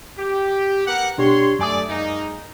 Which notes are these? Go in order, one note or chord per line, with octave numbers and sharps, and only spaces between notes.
G4
B3 A#4 F#5
B2 G3 D4 G4 C#5 C6
F#2 A3 D5 G#5 D#6
G#3 A#3 D#4